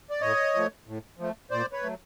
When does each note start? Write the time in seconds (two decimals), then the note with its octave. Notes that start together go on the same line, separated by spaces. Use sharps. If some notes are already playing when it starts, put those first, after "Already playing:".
0.10 D5
0.21 A2 C#5 D#5
0.54 F3 A3
0.87 A2
1.18 F3 A3
1.51 A#2 C5 D5
1.72 B4 C#5
1.83 F#3 A3